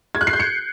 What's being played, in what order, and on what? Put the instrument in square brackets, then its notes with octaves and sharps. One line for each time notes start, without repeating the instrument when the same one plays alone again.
[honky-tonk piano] G#6
F#6
C7
G6
C#7